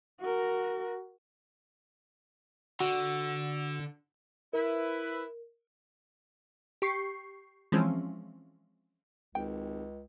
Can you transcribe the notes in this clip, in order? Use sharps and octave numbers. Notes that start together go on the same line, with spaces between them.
F#4 A#4
D3 F#4
E4 A#4 B4
G4 C#6 C7
E3 F3 G#3 C4 C#4
G#1 C#2 G5